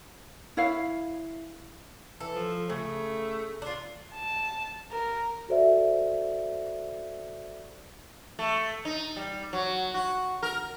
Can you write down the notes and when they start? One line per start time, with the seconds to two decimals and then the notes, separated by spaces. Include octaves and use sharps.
0.57 E4 C#5 F5
2.20 E3 A4
2.35 F3
2.69 C#3 A3
3.62 D4 F4
4.13 A5
4.91 A#4
5.49 F#4 A4 C5 D5 E5
8.39 A3
8.85 D#4
9.16 G3
9.53 F#3
9.94 F#4
10.43 A#4